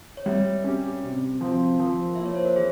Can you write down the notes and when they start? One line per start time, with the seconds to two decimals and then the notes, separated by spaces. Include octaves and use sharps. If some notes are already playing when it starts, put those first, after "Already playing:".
0.17 C#5
0.26 G3 E5
0.64 C#4 G4
1.03 C3
1.41 F3 C4
1.79 F3 A#4
2.15 A#3 E4 E5
2.26 C#5
2.35 C5
2.45 A#4
2.56 E3 G#4